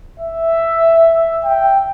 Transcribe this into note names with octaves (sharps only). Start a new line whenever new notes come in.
E5
G5